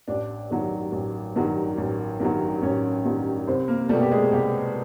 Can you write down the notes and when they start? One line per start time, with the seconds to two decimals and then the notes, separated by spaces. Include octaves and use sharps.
0.08 A1 D4 D5
0.51 G2 D#3 F#3
0.92 A1
1.36 G2 D#3 F#3
1.78 A1
2.20 G2 D#3 F#3
2.62 A1 C#4 C#5
3.05 G2 D#3 F#3
3.47 C2 C4 C5
3.68 A#3 A#4
3.89 B2 G3 A3 A4
4.01 G4
4.11 G#3 G#4
4.32 C2 G3 G4